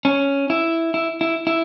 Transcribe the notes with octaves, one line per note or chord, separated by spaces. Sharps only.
C#4
E4
E4
E4
E4